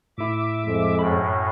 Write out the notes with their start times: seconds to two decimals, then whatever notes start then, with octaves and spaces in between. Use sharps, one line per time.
0.18 A2 E4 E5 D6
0.66 F2 G#3
0.99 F#2 A2 B5